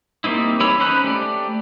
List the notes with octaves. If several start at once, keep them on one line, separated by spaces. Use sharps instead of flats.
G3 A#3 C4 D#4 E4
E3 G4 C#5 B5 E6
C#4 D#4 C5 B5 F#6
A3 G4 D5